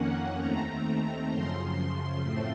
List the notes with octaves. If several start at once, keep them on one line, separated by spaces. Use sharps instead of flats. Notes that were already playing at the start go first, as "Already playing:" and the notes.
Already playing: F2 D#3 A#3 C#4 F#5
D#2 D#3 A3 C4 A#5
F#2 C#3 F3 C6
C6
A2 F3 A3 C4 C6